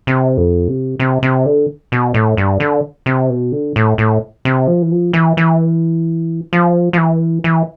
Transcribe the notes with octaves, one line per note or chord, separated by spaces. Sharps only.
C3
F2
C3
C3
C3
D3
B2
A2
G2
D3
C3
B2
D3
A2
A2
C3
F3
E3
F3
E3
E3
F3
F3
E3
E3